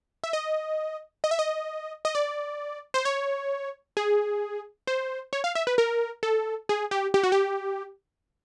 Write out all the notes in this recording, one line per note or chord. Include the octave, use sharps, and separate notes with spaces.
E5
D#5
D#5
E5
D#5
D#5
D5
C5
C#5
G#4
C5
C#5
F5
E5
B4
A#4
A4
G#4
G4
G4
F#4
G4